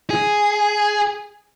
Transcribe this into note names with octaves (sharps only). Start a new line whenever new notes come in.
G#4